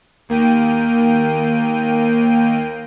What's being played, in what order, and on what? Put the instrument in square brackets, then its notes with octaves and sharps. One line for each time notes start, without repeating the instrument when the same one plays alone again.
[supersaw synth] D#2 A#3 G5 D#7